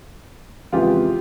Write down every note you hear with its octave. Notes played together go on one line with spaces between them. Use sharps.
F2 C#3 E3 G#3 F4 G4